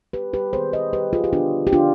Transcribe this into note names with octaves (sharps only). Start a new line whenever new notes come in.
G4 B4
G4 B4
D#3 G3 B3 G#4 C5
C5 D#5
G4 B4
F4 G#4
G4
D3 G3 B3 D4 F4
G4
D4 F4